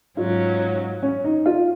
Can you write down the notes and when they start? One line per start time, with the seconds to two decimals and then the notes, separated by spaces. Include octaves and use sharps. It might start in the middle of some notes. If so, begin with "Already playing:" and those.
0.17 G#2 F#3 C#4 F4
1.03 C#4
1.24 D#4
1.46 F4